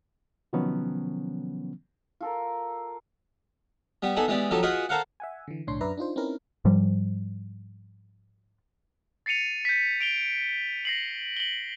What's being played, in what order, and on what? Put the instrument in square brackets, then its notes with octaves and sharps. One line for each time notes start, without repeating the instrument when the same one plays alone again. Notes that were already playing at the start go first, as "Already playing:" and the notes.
[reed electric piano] C3 D#3 F3 F#3 B3 C#4
[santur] F4 A4 A#4
[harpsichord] G3 B3 G4
B3 D#4 G#4 A4
E3 G#3 B3 G4 D5
F3 F#3 D#4 G4 A4
F4 F#4 G#4 B4 D#5 F#5
A4 A#4 C5 F5 F#5
[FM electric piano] E5 F#5 G#5
D3 E3
B1 A2 D3 D4 C#5 C6
F#2 D4 B4 D5 E5 A#5
D4 D#4 F4 C5
C4 C#4 D#4 E4 A#4 B4
[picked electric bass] G#2 F3 G3
[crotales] A6 C7 C#7 D#7 F7
G6 B6
D7 F7 G7
A#6 C7 F#7
F#7 G7